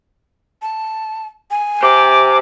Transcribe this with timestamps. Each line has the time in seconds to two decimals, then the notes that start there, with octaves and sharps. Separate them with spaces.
0.62 A5
1.51 G#5
1.83 G4 C5 D6